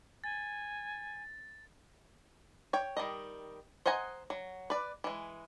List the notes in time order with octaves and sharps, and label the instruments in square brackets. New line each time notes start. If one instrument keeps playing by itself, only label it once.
[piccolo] G#5 [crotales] A6
[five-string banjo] C#5 G5
D#3 G3 D#5
C5 D#5 F#5 G#5 A#5
F#3
B4 D5
E3 G#3